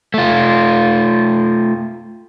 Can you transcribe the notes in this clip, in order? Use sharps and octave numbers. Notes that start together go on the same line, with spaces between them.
A3 F4